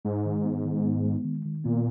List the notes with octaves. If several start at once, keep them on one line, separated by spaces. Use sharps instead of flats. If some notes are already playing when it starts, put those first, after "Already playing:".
G#2 G#3
D#3
B3
D#3
B3
G#3
D#3
D#3
A#2 B3